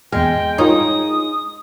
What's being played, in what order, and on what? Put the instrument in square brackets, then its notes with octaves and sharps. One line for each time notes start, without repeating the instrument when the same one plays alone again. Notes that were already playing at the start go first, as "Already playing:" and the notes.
[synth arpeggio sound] E2 F6 [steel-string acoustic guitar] G#3 [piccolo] G5
[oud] D#4 [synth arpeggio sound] F4 A#4 C#5 [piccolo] D#6